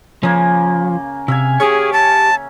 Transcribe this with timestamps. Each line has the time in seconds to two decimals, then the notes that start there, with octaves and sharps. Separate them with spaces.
0.23 C#3 F3 A#3
1.28 C3 E5 F5 G#5
1.60 C#4 G4 G#4 C#5
1.93 A5